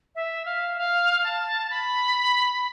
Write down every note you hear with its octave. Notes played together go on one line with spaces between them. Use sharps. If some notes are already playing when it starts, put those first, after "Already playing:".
E5
F5
F5
A5
B5